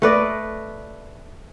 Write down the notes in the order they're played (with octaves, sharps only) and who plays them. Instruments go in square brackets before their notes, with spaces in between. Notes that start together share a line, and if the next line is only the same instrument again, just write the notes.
[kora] A3 B4 D5 D#5